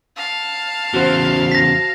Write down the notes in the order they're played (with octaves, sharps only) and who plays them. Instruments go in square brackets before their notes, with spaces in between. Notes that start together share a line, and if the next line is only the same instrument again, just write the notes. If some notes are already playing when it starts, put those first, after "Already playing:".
[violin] F5 A5
[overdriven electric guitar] E2 C#3 [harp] F#4 C5
[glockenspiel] A#6 B6